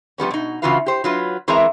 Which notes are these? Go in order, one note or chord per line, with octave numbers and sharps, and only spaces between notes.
F3 G3 B3 C#4
B2 D#4
C#3 E3 F4 F#4 B4 F5
G4 C5
F#3 F4 B4
E3 G#3 C4 A#4 E5 A#5